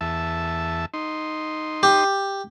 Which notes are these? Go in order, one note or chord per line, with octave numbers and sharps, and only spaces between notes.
E2 E5 A5
D#4 C6
G4